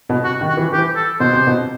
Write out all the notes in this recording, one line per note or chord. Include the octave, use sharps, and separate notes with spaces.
B2
C3 F#4
D#3
F#4
E3
E3 G4
A4
B2 C5
C3
B2